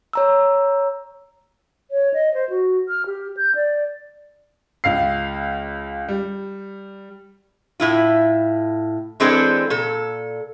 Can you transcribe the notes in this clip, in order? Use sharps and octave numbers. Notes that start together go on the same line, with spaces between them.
C#5 A#5 E6
C#5
D#5
C5
F#4
F6
G4
G6
D5
C#2 F5 C7
G3
A2 E4 F4
E3 G#3 C4 D4 G#4 A4
A#2 A4